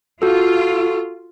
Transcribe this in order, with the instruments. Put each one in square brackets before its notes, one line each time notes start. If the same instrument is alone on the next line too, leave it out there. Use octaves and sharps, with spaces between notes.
[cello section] F4 [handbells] F#4 A4